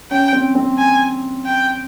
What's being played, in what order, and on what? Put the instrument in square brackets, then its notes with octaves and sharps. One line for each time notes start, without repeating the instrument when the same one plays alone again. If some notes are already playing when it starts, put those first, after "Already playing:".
[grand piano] C#4 [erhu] G5
[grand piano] C4
C4
[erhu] G#5
G5